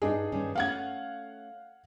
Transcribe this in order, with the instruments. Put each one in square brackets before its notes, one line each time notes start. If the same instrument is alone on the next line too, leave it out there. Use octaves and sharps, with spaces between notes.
[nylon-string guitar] G2 [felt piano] D4 D#4 G#4
[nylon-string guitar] G2 D#3 C#4
[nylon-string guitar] A3 C#4 [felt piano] F5 F#5 G#6